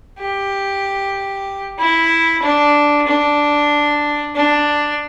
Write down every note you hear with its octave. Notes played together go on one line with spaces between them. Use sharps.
G4
E4
D4
D4
D4